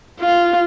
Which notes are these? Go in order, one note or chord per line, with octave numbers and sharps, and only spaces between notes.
F4